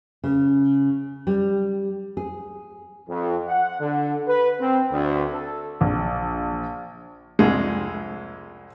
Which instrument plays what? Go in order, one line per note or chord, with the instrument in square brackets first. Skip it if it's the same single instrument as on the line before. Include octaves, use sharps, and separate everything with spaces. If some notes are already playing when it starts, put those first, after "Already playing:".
[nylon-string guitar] C#3
G3
G#4
[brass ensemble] F2
F#5
D3
B4
C4
D2
A4
[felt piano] A#1
[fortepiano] C2 F2 G#3